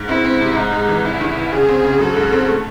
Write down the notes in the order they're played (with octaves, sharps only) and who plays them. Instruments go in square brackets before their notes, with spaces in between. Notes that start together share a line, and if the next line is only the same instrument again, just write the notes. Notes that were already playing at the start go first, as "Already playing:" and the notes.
Already playing: [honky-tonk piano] G#2
[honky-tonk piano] C4 [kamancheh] E4
[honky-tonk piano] C4
C3
[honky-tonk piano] G#2 [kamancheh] D#4
[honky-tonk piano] G#3
E3
[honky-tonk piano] C2 [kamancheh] E4
[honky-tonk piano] D#3
C2
[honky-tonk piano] C#3 [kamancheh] G#4
[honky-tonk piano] C4
C#3
[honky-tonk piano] F#3 [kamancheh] A4
[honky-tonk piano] G#2
C4
A3